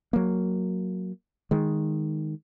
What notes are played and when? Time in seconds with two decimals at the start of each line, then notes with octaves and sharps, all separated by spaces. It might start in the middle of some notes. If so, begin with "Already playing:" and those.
0.13 F#3 A#3
1.51 D#3 G#3